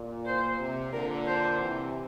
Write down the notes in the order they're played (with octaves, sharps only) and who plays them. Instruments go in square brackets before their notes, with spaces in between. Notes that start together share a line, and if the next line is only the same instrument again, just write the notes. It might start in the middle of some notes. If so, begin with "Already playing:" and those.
Already playing: [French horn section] A#2
[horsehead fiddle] C5
[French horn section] C3
[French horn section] A#2 D3 [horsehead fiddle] A#4
[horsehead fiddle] C5
[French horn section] C3 E3